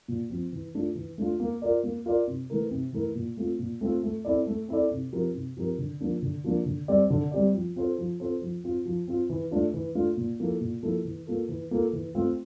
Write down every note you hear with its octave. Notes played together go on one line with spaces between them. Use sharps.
A#2
F3 C4
E3
A3 D4 F4
E3
A3 D4 F4
A#3
F4 A#4 D5
A#3
F4 A#4 D5
C3
E3 A3 E4 A#4
C3
E3 A3 E4 A#4
A#2
A3 C4 F4
A#2
A3 C4 F4
A3
C4 E4 A4 D5
A3
C4 E4 A4 D5
C3
F3 C4 G4 A#4
C3
F3 C4 G4 A#4
D3
F3 A#3 D4
D3
F3 A#3 D4
D3
G3 C4 G4 D5
D3
G3 C4 G4 D5
F3
C4 F4 A4 C5
F3
C4 F4 A4 C5
F3
C4 F4
F3
C4 F4
E3
A3 D4 F4
E3
A3 D4 F4
A#2
F3 A#3 E4 A4
A#2
F3 A#3 E4 A4
E3
A#3 F4 A4
E3
A#3 F4 A4
E3
A3 C4 F4